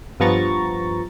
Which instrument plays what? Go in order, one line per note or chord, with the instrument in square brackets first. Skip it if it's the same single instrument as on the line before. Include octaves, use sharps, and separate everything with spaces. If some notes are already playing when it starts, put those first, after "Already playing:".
[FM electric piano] G2 F3 B3 A#5 C#6 A6